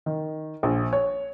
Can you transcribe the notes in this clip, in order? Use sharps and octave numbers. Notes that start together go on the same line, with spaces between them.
D#3
A#1
C#5